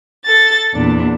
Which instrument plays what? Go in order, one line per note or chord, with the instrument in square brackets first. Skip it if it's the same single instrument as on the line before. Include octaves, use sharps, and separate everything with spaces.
[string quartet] A4 A6
E2 A#2 D4